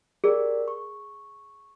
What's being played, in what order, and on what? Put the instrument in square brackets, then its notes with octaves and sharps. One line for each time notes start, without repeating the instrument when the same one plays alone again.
[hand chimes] G4 A#4 D5 [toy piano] G#4
[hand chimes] C#6